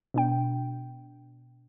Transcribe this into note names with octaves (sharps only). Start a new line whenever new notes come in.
B2 D4 G5